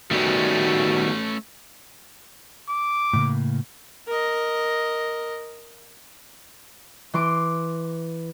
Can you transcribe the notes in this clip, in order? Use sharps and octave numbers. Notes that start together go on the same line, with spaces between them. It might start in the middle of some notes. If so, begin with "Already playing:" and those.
D#3 G3 A3 B3 C#4 F#4
D6
A2 C#3 A#3
A#4 D#5
E3 C6 D6